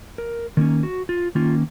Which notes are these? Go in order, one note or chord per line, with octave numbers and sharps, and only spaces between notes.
A#4
D#3 A#3 C#4
F#4
F4
D#3 A#3 C#4 F4